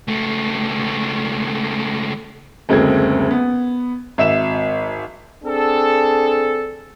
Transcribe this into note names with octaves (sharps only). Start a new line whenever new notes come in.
C#2 A3
F#1 D2 G#3 C4 A4 G#6
B3
G#1 E5 E7
C4 D4 G#4 A4